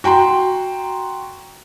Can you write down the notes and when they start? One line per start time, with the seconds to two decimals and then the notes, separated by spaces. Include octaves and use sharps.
0.04 F#4 G5 A#5 C6